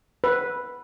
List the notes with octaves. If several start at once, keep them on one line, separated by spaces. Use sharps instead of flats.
B4